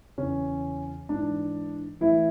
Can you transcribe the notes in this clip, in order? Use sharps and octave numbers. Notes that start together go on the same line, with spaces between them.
E2 C#3 E3 C#4
G#2 E3 D4
A2 E3 E4